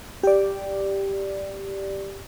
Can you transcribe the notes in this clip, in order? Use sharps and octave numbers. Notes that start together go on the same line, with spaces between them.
G4 D5